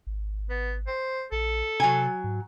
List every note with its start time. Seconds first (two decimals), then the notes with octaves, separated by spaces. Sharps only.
0.07 G#1
0.50 B3
0.87 C5
1.32 A#1 A4
1.80 C3 F#3 G#5
2.24 G#2